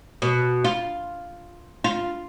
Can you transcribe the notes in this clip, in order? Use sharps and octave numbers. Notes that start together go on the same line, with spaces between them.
B2
F4
F4